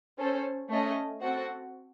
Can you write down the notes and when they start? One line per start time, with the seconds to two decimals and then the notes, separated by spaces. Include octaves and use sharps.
0.18 C#4 A4 C5
0.70 A3 C#4 A4 D#5
1.21 C4 F#4 A4 C5 F#5